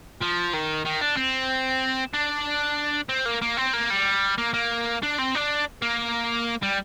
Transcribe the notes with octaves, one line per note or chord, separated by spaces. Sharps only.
F3
D#3
D#3
D4
C4
D4
C4
A#3
A#3
C4
A#3
G3
A#3
A#3
D4
C4
D4
A#3
G3